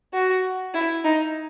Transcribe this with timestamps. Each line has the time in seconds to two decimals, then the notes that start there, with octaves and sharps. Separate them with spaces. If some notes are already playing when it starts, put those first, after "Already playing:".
0.14 F#4
0.74 E4
1.04 D#4